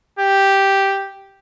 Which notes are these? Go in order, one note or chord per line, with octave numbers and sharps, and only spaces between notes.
G4